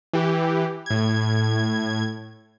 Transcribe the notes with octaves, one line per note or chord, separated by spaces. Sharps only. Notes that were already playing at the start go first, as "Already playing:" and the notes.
E3 G4
A2 G#6